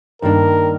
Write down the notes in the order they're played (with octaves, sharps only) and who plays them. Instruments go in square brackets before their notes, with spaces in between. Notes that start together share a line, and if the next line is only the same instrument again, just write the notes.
[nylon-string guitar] G2 D#3 A#3 D4 [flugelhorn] A#4